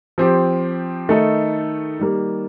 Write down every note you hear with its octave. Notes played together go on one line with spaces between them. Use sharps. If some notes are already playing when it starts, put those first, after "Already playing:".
F3 C4 G4
D#3 A3 D#4 A4
D#3 G3 A#3